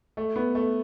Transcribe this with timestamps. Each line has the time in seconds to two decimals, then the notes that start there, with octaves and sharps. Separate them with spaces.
0.17 A3
0.36 B3
0.55 A3